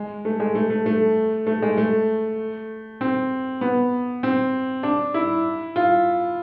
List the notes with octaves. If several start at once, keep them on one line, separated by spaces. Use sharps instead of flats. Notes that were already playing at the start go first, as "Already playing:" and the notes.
Already playing: G#3
A3
G#3
A3
A3
A3
A3
G#3
A3
C4
B3
C4
D4
E4
F4